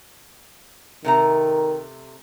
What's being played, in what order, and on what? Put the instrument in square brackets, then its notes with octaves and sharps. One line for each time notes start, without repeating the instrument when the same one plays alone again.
[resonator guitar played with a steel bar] C3 A3 A#5 [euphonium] D#3